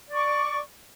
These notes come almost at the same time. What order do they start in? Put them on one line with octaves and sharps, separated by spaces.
D5 C#6 D6